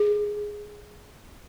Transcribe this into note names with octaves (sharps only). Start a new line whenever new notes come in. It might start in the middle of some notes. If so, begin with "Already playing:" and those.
Already playing: G#4